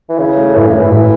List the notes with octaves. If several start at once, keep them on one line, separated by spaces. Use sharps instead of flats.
E3
C#3 E4
A3
A2 E3
C#3
A2
E3
A2 E3